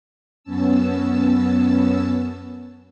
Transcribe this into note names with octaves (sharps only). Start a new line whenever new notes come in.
F#2 B3 C#4 A5 E6